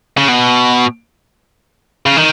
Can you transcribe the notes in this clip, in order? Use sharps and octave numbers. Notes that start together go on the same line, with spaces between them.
C#3
B2
C#3
D#3